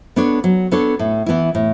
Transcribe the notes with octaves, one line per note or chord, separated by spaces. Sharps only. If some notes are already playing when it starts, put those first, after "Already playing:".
B3 D4 A4 C#5
F#3
B3 D4 A4 C#5
A2
E3 B3 E4
A2